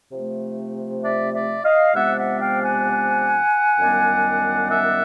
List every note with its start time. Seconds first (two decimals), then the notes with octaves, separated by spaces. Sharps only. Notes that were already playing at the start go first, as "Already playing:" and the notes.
0.12 C3 F3 A3
1.03 D5 E5
1.34 D5 E5
1.64 D#5 F5
1.95 C3 F3 G#3 B3 D4 E5 F#5
2.18 E5 F#5
2.41 F5 G5
2.64 F#5 G#5
3.79 F#2 D#3 G3 B3 D4
4.70 E5 F#5